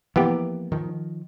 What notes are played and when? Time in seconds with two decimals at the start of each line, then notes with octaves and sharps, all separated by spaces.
0.16 E3 F3 A#3 B3 G4
0.72 D#3 F3